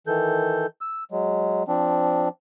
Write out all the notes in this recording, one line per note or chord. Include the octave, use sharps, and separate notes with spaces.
D#3 E3 A4 G6
E6
F#3 G#3
F3 C4 D4